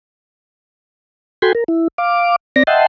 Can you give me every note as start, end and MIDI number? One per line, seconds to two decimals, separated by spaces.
1.42 1.53 66
1.42 1.53 69
1.42 1.53 79
1.42 1.53 80
1.42 1.53 83
1.42 1.53 84
1.55 1.64 70
1.68 1.88 64
1.98 2.36 77
1.98 2.36 86
2.56 2.63 60
2.56 2.63 74
2.56 2.63 94
2.67 2.86 75
2.67 2.86 76
2.67 2.86 78
2.67 2.86 79
2.67 2.86 81
2.67 2.86 84